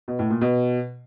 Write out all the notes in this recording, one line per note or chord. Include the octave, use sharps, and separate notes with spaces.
B2
A2
A#2
B2